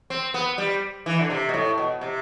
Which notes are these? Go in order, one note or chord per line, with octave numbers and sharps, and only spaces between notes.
C4
B3
G3
E3
D3
C3
B2
A2
B2
C3